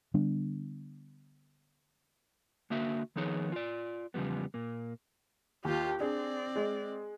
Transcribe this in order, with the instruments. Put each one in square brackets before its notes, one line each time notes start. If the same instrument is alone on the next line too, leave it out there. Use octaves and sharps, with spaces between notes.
[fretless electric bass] D3 G3 B3 D4
[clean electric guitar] D3 A#3 F#4 E5
D#3 F3 B3 D#4 G#4 C#5
F4 D5
E2 C#3 F3 G3 B3
A#2 A#3
[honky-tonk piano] D#2 [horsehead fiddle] F4 G4
[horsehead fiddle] C4 D5 [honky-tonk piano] D4 G#4
[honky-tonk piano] G#3